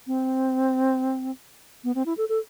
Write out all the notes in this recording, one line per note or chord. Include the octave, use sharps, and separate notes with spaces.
C4
B3
C4
E4
A4
A4